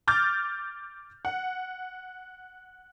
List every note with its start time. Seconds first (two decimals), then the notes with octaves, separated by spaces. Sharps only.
0.08 D6 F6 G6 A6
1.25 F#5